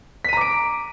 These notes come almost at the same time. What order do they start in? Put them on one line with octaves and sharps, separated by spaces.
B6 D#7 A#5 D6 D7